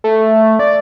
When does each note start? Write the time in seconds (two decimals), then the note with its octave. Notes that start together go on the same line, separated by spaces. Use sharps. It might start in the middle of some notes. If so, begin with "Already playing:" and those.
0.04 A3
0.59 D5